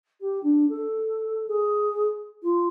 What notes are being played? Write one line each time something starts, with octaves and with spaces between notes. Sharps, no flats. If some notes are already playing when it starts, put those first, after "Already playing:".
G4
D4
A4
G#4
F4